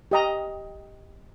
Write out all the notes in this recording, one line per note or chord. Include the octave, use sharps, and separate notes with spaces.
G4 D#5 A#5